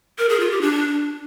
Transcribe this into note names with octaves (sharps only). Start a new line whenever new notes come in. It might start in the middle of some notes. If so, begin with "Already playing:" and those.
A#4
G#4
F4
G4
D4